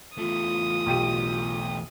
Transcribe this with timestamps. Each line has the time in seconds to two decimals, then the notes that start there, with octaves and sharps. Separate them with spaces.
0.18 E2 A3 F4 D#6
0.86 B1 G4 D#7